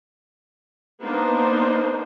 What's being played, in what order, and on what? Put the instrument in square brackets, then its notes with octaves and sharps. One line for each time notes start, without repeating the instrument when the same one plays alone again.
[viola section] A#3 B3 D4 D#4 C5